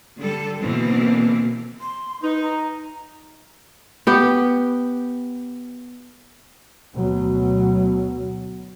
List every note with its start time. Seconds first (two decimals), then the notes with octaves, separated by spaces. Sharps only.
0.18 D3 G3 A4
0.61 B2 D3 E3 A#3 C4
1.81 C6
2.23 D#4 B4
2.43 A#5
4.07 B3 G4
6.96 D2 B2 F#3